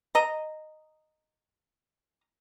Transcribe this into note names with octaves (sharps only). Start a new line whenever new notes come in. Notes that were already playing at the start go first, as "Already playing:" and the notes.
D#5 A#5